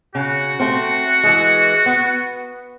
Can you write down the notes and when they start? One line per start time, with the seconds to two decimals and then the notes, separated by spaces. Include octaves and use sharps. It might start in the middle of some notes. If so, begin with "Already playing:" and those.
0.15 C#3 F#4
0.60 A3 C4
1.23 E3 G#3
1.86 B3